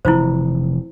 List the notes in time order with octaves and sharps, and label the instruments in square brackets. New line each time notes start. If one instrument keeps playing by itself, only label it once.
[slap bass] F1 E3 [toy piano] E4 F4 C5